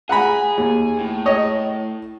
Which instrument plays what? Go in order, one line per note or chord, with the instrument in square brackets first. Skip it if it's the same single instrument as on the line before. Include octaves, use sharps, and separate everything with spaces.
[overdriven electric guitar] G#4 [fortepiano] F#5 A#5 B5
[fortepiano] D#2
[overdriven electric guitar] A2
[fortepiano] C#5 D#5